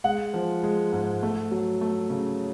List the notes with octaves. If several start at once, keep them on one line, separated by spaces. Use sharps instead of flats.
G#3 F#5
F3
G#3
G#2
A3
F#3
A3
C#3